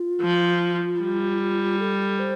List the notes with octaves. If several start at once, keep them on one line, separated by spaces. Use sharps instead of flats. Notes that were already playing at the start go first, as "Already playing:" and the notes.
Already playing: F4
F3
G3
A4
C5